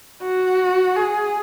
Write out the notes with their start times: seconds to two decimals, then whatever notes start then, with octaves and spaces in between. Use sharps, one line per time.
0.22 F#4
0.96 G#4